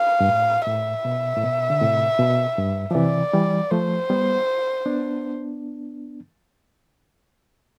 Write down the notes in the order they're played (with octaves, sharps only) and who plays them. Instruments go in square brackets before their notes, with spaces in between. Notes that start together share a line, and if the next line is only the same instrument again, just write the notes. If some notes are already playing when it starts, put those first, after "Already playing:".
Already playing: [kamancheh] F5
[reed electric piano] G2
A2
[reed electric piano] A2 [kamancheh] E5
[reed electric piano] B2
A2
B2
D3
A2 C3
B2
G2
F3
[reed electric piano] C3 E3 [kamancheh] D5
[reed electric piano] E3 G3
[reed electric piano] F3 A3 [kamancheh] C5
[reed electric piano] G3 B3
B3 D4